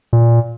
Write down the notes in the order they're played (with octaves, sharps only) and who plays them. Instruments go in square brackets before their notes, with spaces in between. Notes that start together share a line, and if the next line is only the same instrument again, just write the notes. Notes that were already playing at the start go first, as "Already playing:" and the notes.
[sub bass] A#2